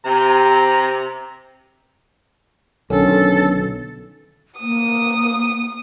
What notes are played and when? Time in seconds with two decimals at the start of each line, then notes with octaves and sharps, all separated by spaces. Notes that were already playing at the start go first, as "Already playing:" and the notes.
0.05 C3 A#5
2.90 B1 D3 D#3 C#4 A4
4.60 A#3 D#6